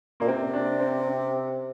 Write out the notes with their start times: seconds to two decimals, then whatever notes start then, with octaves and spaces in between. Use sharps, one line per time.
0.20 A#2 A#3
0.28 C3 C4
0.53 D4
0.79 C4
1.07 C4